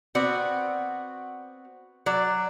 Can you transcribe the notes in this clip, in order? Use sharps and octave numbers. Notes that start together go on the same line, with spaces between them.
B3 C4 F#4 D5
F#3 D5